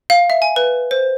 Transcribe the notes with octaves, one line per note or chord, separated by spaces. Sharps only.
F5
E5
G#5
B4
C5